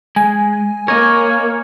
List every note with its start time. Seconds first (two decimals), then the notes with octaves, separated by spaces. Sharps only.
0.16 G#3 G#5
0.88 A#3 A#4 C#5 D#5